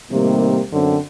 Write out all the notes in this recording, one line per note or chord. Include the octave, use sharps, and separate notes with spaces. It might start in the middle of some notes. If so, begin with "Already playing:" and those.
A2 C3 D#3 G3 A#3
F#2 D3 C4